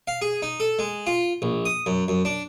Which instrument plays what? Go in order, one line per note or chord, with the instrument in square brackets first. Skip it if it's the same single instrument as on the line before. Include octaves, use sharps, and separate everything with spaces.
[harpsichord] F5
G#4
D#4
A4
G#3
F4
A#1
D#6
F#2
F#2
D4